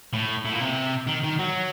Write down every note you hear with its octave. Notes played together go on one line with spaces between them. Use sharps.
A2
A2
A#2
C3
D#3
D#3
F#3